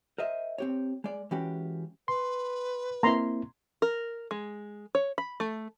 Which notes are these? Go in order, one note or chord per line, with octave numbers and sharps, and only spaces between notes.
A#4 C5 D#5 E5
C4 G4 C#5
G#3 D5
E3 G#3 C#4 F#4 G4
B4 C6
A#3 C4 E4 A#5 C6
A#4
G#3
C#5
B5
A3